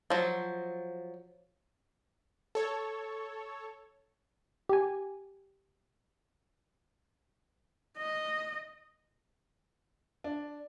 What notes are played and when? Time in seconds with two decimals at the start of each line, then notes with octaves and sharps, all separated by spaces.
0.10 F3 F#3
2.55 A4 C#5
4.69 G4 G#5
7.98 D#5
10.24 D4